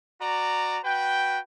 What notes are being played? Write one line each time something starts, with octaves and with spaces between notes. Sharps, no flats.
F#4 D5 A#5
F#4 B4 G5